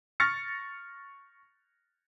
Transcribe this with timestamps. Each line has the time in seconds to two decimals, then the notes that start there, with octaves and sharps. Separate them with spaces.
0.20 C#6 F6 A6 A#6 C#7